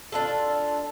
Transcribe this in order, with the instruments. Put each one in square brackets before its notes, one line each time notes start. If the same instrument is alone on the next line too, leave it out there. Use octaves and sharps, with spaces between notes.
[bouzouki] D4 F4 A4